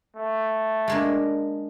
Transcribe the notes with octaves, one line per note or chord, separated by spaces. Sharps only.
A3
G#3 A#3 D4